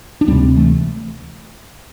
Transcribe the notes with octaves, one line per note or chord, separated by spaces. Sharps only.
D4
D2 C3 G3 C4
E3 A3